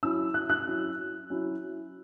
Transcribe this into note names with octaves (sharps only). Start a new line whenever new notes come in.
F#3 C#4 E4 E6
F#6
F#6
F#3 C#4 E4
F#3 C#4 E4